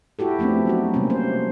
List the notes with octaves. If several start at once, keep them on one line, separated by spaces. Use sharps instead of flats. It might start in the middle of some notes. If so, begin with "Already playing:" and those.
E4 F#4 G4 A4
F3 A3 B3 C4 D4
F#3 D#4 F#4
C3 G3 A#3 C#4
C5